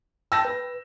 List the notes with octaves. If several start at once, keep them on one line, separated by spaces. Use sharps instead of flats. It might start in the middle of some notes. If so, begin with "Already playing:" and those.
G5 A5 E6 G6 A#6
B4